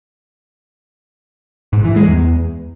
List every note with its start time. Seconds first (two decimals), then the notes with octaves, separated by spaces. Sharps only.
1.73 G#2
1.85 E3
1.96 G#3
2.08 E2